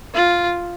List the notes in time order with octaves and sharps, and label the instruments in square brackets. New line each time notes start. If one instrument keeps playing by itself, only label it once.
[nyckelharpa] F4